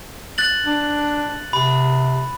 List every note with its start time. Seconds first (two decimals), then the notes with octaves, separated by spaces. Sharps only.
0.38 F#6 A6 F#7
0.66 D4
1.53 C3 B5